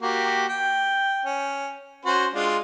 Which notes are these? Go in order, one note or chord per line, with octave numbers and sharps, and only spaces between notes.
A#3 F#4 G4
G5
C#4
C#4 F#4 C5
G#3 D4 F4